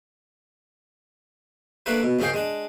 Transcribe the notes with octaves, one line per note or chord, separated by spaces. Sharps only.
A3 A#3 D4 E4 B4
B2
C#2 G#2 D#3 G#4 F5 G5
G#3 D4